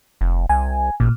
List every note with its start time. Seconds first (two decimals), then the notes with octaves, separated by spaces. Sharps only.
0.21 F1
0.49 C2 G#5
1.00 A1 A#2